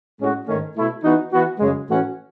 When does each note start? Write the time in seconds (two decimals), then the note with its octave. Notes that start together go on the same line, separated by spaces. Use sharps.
0.20 A2 G#3 C#4 F#4
0.47 G#2 D#3 A3 C#4
0.76 B2 A3 E4
1.03 E3 B3 D#4 F#4
1.32 E3 B3 F#4
1.60 F#2 C#3 G#3
1.87 A2 E3 A3 C#4 F#4